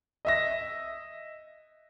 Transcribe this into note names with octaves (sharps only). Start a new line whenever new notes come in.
D#5 E5 A#6